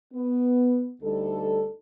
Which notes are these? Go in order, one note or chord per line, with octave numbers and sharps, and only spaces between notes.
B3
D2 G3 D#4 A4